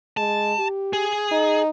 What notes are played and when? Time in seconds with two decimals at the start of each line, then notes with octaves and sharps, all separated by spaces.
0.17 G#3 A5
0.59 G4
0.93 G#4
1.32 D#4